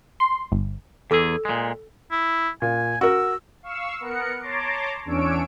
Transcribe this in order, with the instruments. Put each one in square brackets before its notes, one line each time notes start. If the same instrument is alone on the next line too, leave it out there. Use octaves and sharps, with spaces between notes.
[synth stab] C6
G1
[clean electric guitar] E2 G#4 [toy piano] A4 D6 E6
[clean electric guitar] A#2 G#3
[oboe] E4
[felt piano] A#2 [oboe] G#5
[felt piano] F#4 A#4 [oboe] E6
[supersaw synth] F5 C#6 E6
B3 A#4 F#5 C#7
C#5 A5 A#5 C6 D6
E2 C#4 D4 C#5 E6 D7